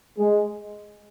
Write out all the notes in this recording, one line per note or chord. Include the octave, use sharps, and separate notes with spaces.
G#3